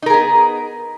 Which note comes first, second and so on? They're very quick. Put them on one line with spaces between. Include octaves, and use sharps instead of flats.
D#4 A#4 G#4 B3